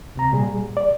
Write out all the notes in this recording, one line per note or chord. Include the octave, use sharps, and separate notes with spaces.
C#2 C3 A#5
A#2 G3 G#4
D5